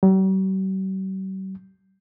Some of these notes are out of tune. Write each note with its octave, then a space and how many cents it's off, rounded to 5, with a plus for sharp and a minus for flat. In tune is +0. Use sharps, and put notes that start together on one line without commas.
G3 -45